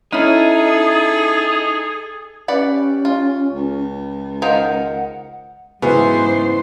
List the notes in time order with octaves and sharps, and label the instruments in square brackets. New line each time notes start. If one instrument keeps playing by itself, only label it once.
[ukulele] C#4 E4 [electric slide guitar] D#4 [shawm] G#4 [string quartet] A4
[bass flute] C#4 [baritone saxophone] G4 [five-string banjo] B4 D5 F#5
[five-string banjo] F4
[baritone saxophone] C#2
[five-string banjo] D#3 C5 F5 [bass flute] F#5
[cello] G#2 C5 [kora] C#3 E3 F#3 [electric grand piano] B3